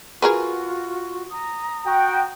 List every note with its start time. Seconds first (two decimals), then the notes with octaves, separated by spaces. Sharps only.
0.22 F4 F#4 G#4 A#4 B4 C#6
1.31 A#5 D#6
1.86 F#4 G5